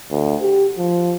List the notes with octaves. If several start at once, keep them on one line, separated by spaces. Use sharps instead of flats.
D2
G4
F3